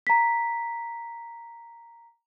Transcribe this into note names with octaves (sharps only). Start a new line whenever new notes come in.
A#5 B6